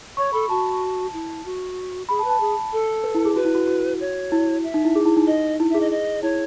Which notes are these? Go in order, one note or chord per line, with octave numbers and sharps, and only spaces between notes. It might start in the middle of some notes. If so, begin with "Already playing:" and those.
C#5 C#6
A4 B5
F#4 A5
E4
F#4
G#4 B5
A5
B4
A5
G#4
A4
B4
E4
G#4
F#4 B4
E4
F#4
F#4
C#5
E4
E5
D#4
E4
G#4
E4
D#4
D#5
E4
G#4 E5
D#5
D#5
E4 C#5